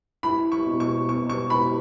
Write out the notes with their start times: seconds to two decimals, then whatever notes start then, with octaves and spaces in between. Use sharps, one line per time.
0.23 E4 B5
0.52 C#6
0.66 B2
0.80 C#6
1.09 B2 C#6
1.30 C#6
1.50 E4 B5